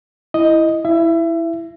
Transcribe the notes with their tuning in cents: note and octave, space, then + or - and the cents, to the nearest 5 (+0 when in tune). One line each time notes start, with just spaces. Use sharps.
E4 +0 D#5 +0
E4 +0 E5 +25